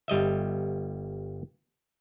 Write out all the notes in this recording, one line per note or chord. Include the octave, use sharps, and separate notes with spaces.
G1 G3 D#5 E5